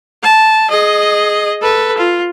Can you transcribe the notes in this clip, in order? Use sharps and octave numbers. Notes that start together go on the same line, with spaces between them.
A5
G#4 D#5
A4 B4
F4